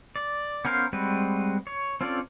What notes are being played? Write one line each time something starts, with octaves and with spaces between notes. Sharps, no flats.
D5
B3 C#4 A#4 C5 F5
G3 G#3 C4 F#4 B4
C#5
C4 C#4 F4 A4 D5